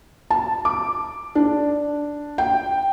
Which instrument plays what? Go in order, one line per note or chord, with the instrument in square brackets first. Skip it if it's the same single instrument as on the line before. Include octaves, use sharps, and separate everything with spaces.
[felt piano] A5
D6
D4
G5